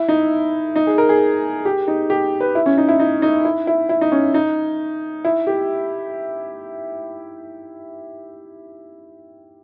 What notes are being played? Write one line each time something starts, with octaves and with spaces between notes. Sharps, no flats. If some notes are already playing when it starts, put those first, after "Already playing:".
Already playing: E4
D#4
D#4
G#4
A#4
G#4
G4
D#4
G4
B4
E4
C#4
D#4
E4
D#4
D#4
E4
E4
E4
D#4
C#4
D#4
E4
G4